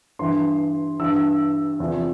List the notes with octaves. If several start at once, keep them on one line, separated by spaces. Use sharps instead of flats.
G2 E3 C6
G2 E3 E6
E2 C3 F3